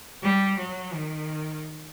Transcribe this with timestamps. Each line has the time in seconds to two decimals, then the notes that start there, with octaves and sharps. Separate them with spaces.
0.22 G3
0.58 F#3
0.94 D#3